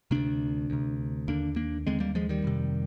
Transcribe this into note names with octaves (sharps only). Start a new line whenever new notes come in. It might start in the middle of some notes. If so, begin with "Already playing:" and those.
D2 C3 A#3 D4
D2 C3
D#2 D3 A#3 D4
A#3 D4
D#2 D3 G#3 C4
G3 A#3
F3 G#3
D#3 G3
F2 C3